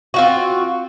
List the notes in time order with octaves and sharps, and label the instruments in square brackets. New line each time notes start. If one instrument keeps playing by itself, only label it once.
[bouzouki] C4 F4 F#4